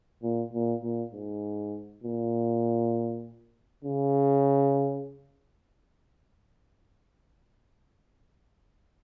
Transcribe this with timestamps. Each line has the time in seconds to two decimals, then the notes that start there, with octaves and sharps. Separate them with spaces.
0.23 A#2
0.53 A#2
0.83 A#2
1.13 G#2
2.04 A#2
3.85 C#3